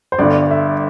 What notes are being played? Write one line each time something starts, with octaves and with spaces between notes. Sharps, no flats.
C5
G1 G2 D3 D5
E5